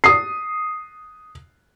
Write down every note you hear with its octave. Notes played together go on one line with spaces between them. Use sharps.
D#6 C7